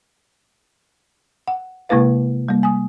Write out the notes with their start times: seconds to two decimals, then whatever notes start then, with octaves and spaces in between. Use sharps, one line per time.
1.48 F#5
1.89 C3 G#3 A#3 E4 B4 F5
2.48 G3 A#3
2.63 G#5 D#6